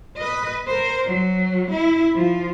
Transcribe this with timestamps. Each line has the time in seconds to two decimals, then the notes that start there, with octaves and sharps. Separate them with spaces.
0.17 B4 D#5
0.67 A#4 C5
1.06 F#3
1.71 E4
2.15 F3 F4